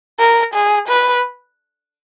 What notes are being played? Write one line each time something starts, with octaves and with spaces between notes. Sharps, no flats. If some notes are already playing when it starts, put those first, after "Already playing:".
A#4
G#4
B4